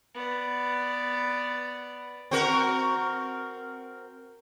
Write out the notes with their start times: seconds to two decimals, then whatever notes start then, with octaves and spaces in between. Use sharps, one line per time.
0.15 B3 D5
2.31 C4 F#4 A#4